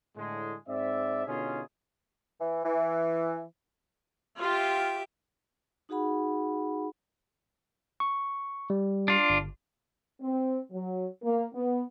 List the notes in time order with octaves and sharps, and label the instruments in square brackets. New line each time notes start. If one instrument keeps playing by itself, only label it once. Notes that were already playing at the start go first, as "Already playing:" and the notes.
[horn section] A2 D3 G#3
G#2 C4 D5 E5
B2 D3 C#4 D#4 F4 G#4
[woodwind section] E3
E3
[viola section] F4 [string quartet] G4 E5 G5
[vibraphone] D#4 F#4 G#4 F#5 B5
[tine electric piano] C#6
G3
[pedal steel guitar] D4 F4
[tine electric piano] G1
[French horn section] C4
F#3
A#3
B3